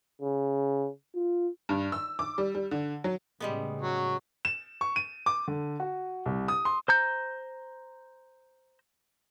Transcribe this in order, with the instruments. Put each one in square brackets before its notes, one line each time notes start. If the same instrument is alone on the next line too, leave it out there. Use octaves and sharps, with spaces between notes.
[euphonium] C#3
F4
[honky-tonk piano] G2
E6
D6
G3
G3
D3
F#3
[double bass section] A2 C#3 [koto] G3 G#3 B3
[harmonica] F#3 C#6
[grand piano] E7
C#6
D#7
D6
D3
F#4
C2
D#6
C6
[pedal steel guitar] C5 A#5 G6